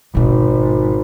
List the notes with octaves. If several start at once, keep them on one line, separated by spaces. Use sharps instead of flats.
G#1 B2 F4